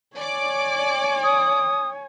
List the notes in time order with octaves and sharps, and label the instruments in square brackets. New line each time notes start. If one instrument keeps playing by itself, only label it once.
[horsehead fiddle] C#5 G#5 [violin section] D5 D6
[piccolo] D#6